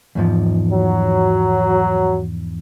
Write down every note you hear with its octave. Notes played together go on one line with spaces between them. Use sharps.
E2 G#2 F3
F#3